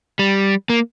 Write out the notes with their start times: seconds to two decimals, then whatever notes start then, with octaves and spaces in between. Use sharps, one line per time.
0.19 G3
0.70 A#3